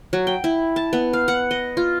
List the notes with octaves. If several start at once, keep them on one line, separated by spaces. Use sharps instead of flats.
F#3
G5
E4
A5
B3
F5
F#5
D#5
F4